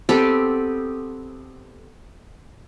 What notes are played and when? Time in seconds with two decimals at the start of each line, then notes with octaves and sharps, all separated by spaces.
0.09 B3 C4 G4 A4